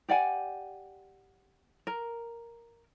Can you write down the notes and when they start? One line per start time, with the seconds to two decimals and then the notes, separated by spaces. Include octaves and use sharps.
0.09 G4 D5 F#5 G#5
1.87 A#4